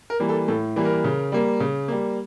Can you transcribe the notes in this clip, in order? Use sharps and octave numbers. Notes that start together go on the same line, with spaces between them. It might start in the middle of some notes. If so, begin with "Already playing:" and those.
A#4
E3 G3 A#3
A4
A2 A4
E3 G3 A#3
A#4
C#3
G3 A#3
C#3
G3 A#3